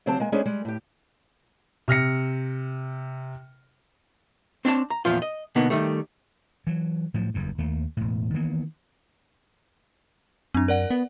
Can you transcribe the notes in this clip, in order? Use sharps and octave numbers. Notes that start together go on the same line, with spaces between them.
C#3 F#3 C4 G4 C5 A5
G#3 A#3 G#5
G#3 C#4 D4 E4 G#4 C5
G3 G#3
A2 G4
C3 F6 A#6 C#7
C4 D4 C#5 A5
A#5
E2 A#2 F3 F4
D#5
B2 D3 A#3 B3 D#4
D#3 G3 A3
E3 F#3
A2 F3 F#3
F#1 E2 G2
D#2 A3 A#3
E1 A2
D#3 E3 A#3 B3
F#2 C4 D4
A#4 D5 F#5
B3